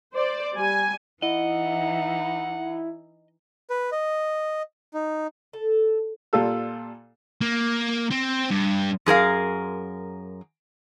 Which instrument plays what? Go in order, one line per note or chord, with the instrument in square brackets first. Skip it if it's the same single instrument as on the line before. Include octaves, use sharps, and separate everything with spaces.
[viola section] C5 D5
G3 G#5
[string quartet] E3 D#4 [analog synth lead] E4 [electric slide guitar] D#5 [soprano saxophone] F#5
[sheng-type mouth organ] B4
D#5
D#4
[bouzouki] A4
[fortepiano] A#2 G3 F4 A4 E6
[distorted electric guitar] A#3
C4
G2
[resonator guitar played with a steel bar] F#2 G#4 A#4 F5